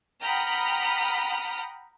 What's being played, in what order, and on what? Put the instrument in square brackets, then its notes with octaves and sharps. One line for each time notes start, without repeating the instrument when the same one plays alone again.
[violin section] F#5 G5 A#5 B5 D#6 F6